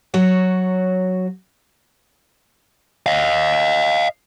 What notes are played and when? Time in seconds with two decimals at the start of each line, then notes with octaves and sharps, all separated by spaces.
0.14 F#3 F#4 C#5
3.06 D#5 F5